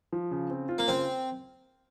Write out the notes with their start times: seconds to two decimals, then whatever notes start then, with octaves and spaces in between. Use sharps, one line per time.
0.13 F3
0.31 C#3
0.50 C4
0.69 F4
0.78 A#3
0.88 C#3 C4